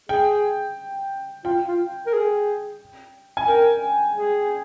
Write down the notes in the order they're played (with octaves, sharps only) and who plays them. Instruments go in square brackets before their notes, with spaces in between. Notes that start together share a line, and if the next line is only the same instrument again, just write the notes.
[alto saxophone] G#4 [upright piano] G5
[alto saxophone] F4 [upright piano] G5
[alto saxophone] F4
A#4
G#4
[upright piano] G#5
[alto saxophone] A#4 [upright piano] G5
[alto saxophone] G#4